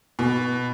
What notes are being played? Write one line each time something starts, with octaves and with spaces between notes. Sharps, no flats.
B2